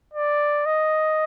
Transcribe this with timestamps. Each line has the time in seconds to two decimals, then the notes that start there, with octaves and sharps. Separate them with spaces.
0.14 D5
0.66 D#5